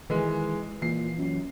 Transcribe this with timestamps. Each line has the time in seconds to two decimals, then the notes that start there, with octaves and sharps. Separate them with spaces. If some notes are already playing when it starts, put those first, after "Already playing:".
0.10 D#3 E3 G#3
0.82 A#2 E3 C7
1.18 F#2